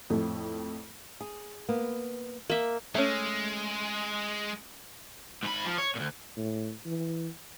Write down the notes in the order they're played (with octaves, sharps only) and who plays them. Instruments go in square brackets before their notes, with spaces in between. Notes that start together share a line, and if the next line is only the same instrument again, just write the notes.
[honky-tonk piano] F2 A2 F3 A3
[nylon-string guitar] G#4
A#3 B3
[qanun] A#3 E5
[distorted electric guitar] G#3 [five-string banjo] A3 C#4
[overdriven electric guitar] G#2 B5
F3
C#5
D2 A#2
[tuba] A2
E3